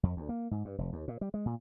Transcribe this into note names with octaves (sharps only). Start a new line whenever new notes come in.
F2
D2
A#3
G#2
G2
F1
D#2
A#2
G3
G#3
A#2